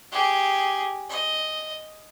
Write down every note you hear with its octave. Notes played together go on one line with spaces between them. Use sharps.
G4 G#4
D#5